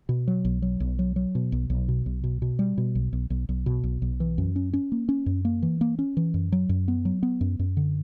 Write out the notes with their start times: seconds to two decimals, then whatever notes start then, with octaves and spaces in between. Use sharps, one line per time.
0.09 B2
0.28 F#3
0.45 B1
0.62 F#3
0.80 B1
0.99 F#3
1.16 F#3
1.35 B2
1.52 B1
1.70 B1
1.88 B2
2.06 B1
2.24 B2
2.42 B2
2.59 G3
2.78 B2
2.95 B1
3.13 B1
3.30 B1
3.49 B1
3.66 B2
3.84 B1
4.02 B1
4.20 E3
4.38 F#2
4.56 C#4
4.73 C#4
4.92 A#3
5.09 C#4
5.26 F#2
5.45 A#3
5.62 E3
5.81 A#3
5.99 C#4
6.17 E3
6.34 F#2
6.52 F#3
6.69 F#2
6.88 B3
7.05 F#3
7.23 B3
7.41 F#2
7.59 F#2
7.77 D3